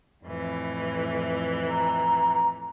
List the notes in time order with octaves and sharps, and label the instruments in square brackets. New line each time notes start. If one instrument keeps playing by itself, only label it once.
[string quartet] F2 A2 E3
[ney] A#5